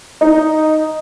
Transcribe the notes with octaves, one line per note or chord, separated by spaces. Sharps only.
D#4